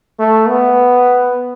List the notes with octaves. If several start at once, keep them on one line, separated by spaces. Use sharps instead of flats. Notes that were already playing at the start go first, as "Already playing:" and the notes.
A3
B3